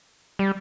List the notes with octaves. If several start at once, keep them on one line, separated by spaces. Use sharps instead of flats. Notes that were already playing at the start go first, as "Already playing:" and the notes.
G3